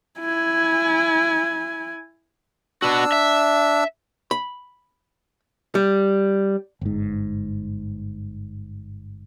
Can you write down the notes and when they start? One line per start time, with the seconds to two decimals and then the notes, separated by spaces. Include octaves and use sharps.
0.19 E4 G#5
2.82 B3 D4 F#4 E6
3.12 E5
4.31 B5
5.75 G3
6.81 G1 G#2